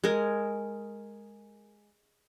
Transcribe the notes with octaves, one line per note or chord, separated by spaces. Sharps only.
G#3 A#4